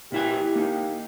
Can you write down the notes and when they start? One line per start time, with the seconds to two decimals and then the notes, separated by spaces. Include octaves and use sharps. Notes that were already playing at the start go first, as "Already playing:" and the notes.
0.12 A#2 E4 G4 G#5
0.55 A#3 D#4